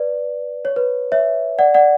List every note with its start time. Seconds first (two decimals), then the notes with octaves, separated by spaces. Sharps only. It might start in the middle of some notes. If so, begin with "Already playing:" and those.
Already playing: B4 D5
0.65 C#5
0.76 B4
1.12 C#5 E5
1.59 D5 F#5
1.74 D5 F#5